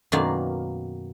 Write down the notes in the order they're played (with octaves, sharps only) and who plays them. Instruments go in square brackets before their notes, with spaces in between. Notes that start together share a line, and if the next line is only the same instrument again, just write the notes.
[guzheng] F#2 B2 D#3 A#3 D5 F5